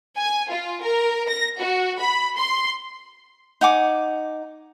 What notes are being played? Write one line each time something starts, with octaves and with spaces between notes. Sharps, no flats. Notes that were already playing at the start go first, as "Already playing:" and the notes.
G#5
F4
A#4
A#6
F#4
B5
C6
D#4 F#5 G#5 D6